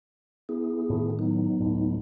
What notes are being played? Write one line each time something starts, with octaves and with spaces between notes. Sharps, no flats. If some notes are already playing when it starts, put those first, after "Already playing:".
B3 E4 G#4
A2 D#3
F#3 B3 D#4
D1 A2